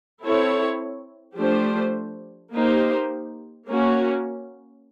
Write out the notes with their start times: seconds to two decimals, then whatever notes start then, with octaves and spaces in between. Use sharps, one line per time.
0.23 C4 E4 A4 C#5
1.37 F3 A3 D4 G4 C5
2.52 A#3 D#4 G4 C5
3.67 A#3 C#4 F#4